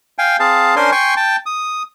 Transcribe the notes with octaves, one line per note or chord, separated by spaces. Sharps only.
F5 G5 G#5
C4 G#4 F5 A5
C#4 D4 A#4 C5 G#5 C6
G5 G#5 C6 C#6
G5 A5
D#6